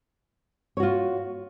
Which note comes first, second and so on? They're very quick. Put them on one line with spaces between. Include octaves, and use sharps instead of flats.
C#5 F#4 F4